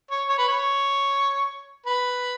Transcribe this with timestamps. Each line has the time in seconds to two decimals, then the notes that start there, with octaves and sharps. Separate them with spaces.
0.11 C#5
0.29 C#5
0.38 B4
0.48 C#5
1.86 B4